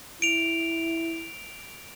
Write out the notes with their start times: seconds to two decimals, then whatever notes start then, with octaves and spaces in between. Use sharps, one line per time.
0.22 E4 D7 F7